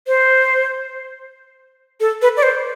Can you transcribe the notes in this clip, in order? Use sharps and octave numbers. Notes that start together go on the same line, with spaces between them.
C5
A4
B4
D5
C5